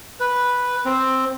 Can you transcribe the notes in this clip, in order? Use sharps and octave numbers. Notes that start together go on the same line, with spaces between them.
B4
C4